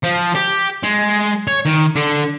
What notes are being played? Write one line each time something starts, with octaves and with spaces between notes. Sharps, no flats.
F3
G4
G#3
C#5
D#3
D3